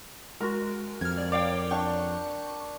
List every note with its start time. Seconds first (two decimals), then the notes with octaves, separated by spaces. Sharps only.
0.41 G#3 F#4 A#4
1.01 F2 F6 G#6
1.18 D5
1.32 C#5 D5 F5 G5
1.71 D4 G5 C#6